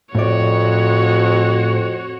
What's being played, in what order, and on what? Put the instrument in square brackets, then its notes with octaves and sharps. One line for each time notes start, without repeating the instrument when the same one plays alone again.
[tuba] F2 [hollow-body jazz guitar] A2 D5 [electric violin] F#4 C#5